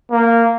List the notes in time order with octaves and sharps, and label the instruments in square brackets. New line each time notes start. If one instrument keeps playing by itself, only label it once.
[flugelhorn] A#3